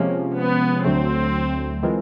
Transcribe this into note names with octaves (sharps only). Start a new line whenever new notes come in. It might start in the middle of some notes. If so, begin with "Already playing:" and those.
Already playing: C3 F3 G#3 A#3 C#4
B3
D2 D3 F#3 A3 C4
E3 G#3 C4 F4 A#4